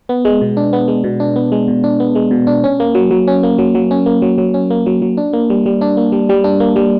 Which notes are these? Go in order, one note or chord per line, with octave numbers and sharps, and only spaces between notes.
B3
G#3
B2
D4
B3
G#3
B2
D4
B3
G#3
B2
D4
B3
G#3
B2
D4
C#4
A#3
F#3
F#3
C#4
A#3
F#3
F#3
C#4
A#3
F#3
F#3
C#4
A#3
F#3
F#3
D4
A#3
G3
G3
D4
A#3
G3
G3
D4
A#3
G3